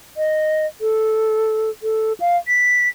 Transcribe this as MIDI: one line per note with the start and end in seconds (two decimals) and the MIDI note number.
0.17 0.66 75
0.81 1.70 69
1.83 2.13 69
2.20 2.37 77
2.48 2.89 95